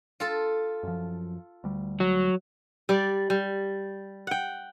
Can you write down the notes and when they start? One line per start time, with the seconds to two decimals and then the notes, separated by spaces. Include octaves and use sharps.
0.20 F4 A4
0.83 F#2 F3
1.64 D2 G3
2.00 F#3
2.89 G3 D5
3.30 G3
4.27 F#5 G5